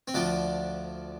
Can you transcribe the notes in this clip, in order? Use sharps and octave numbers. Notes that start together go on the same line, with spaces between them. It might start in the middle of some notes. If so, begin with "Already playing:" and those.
C4
D2 D3 F3 D4